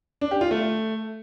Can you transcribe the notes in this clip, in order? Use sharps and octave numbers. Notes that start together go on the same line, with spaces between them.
D4
G4
F4
A3